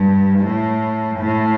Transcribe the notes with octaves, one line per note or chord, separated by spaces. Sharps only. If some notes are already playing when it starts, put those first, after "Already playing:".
Already playing: G2
A2
A2